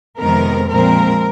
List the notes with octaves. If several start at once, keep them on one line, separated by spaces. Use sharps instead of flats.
F2 C3 D#3 G#3 B3 A#4
A#2 F3 G#3 C4 A#4